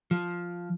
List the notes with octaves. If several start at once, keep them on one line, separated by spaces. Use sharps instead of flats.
F3